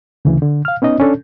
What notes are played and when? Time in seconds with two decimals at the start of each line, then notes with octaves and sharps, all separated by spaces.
0.25 D2 C#3 E3
0.42 D3
0.65 F5 F6
0.82 B3 C#4 D#4 D#5
1.00 C#4 D4 A4